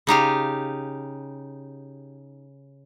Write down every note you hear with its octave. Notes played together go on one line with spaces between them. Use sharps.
C#3 D#4 G4 F5